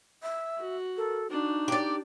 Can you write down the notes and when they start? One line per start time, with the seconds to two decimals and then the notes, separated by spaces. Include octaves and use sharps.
0.23 E5
0.58 F#4
0.97 A4 A#4
1.31 D4 D#4 F#4
1.68 G4 D5